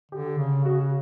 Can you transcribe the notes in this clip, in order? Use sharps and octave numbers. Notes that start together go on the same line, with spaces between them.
D3 G4
C#3
C#3 F#4